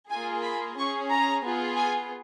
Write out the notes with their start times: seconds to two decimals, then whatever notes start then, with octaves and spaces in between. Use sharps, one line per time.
0.10 A#3 F4 G#4 G#5
0.44 B5
0.77 C#4 G#4 C#6
1.10 A#5
1.43 B3 F4 G#4
1.77 G#5